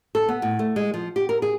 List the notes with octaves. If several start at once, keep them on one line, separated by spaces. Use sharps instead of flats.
A4
B3
A2
A3
G#3
F3
G4
A#4
G#4